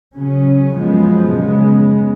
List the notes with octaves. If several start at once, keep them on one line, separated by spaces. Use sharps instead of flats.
C#3 F#3 C#4
F#2 F3 G#3 B3
C#3 G#3 B3